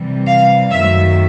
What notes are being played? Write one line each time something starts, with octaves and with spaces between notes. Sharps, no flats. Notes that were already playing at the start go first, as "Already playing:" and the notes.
Already playing: C3 E3 G3
F5
F#2 D#3 F#3 A3 E5